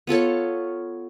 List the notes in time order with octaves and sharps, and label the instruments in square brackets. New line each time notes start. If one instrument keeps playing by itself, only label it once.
[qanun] B3 F4 A4 C#5